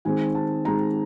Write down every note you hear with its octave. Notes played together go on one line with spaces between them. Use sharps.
D#3 G#3 C4 G#5
A5
D#3 G#3 C4 A#5